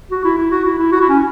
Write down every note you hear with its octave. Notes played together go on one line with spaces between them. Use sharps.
F#4
E4
E4
F#4
E4
E4
F#4
E4
C#4